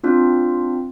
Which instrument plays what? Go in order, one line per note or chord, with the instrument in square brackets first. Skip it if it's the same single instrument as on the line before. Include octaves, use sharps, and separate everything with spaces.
[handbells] C4 D4 F4